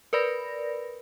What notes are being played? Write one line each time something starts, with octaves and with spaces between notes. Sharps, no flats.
A#4 B4 D5 B5 A#6